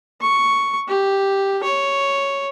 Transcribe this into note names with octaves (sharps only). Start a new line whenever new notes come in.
C#6
G4
C#5